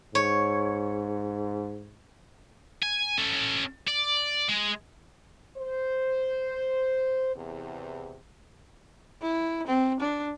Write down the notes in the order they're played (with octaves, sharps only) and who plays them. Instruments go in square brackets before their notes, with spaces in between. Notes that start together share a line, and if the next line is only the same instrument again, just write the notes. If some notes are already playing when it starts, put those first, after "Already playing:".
[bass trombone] G#2 [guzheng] C#5
[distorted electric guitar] G#5
C#4 A4
D5
G#3
[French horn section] C5
E2 C3
[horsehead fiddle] E4
C4
D4